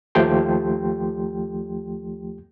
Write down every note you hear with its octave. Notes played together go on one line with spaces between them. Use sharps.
D#2 F3 A3 G4 G5 C6